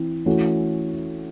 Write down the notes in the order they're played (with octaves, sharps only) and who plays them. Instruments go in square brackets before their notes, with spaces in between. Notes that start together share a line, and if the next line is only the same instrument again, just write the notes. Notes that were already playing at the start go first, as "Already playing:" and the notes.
Already playing: [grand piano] E3 C4 E4
E3 A3 C#4 F#4